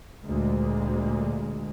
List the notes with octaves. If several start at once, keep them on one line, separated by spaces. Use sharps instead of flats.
D2 A#2 G#3